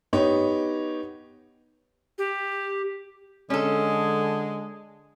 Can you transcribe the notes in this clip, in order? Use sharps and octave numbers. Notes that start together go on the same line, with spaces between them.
B3 D#4 G4 C#5
G4
D3 G#3 C#4 A4